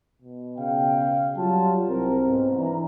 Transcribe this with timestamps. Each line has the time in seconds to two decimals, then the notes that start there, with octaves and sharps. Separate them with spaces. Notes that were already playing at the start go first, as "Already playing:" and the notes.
0.22 B2
0.58 C#3 F5 G5
1.37 F#3 G3 F4 A5
1.89 C2 C4 A#4
2.26 G#2 B2
2.57 E3 D4 A#5